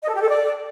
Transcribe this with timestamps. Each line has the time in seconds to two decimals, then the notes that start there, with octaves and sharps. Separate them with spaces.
0.02 D#5
0.09 A4
0.15 G4
0.22 A4
0.28 D5